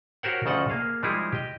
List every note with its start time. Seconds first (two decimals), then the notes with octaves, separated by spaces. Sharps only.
0.23 F#4 G4 A#4 C5 C#5 F#5
0.46 D2 C#3 F3 A4 D#5 F#5
0.70 A#3 G#4 F5
1.03 F3 G3 G#3 D#4 E4 G#4
1.32 G4 D#5